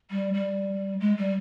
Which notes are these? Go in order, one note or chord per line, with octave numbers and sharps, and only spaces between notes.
G3
G3
G#3
G3